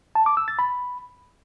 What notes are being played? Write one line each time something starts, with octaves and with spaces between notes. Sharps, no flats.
A5
D6
E6
A6
B5